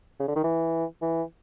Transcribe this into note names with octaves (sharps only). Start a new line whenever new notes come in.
C#3
D3
D#3
E3
E3